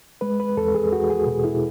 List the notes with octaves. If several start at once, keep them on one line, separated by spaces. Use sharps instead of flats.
G#3 B4
B4
E2 A4
G#4
E2 F#4
G#4
B2
E4